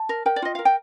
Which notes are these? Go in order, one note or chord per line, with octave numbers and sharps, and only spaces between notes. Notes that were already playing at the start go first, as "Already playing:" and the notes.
Already playing: A5
A#4
A#4 G5
D5
F4 D#5
A#4 F5
G5